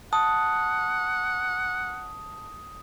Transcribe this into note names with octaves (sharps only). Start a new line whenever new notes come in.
F#5 A5 D#6